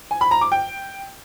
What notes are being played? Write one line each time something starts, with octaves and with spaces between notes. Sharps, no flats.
G#5
B5
A#5
D6
G5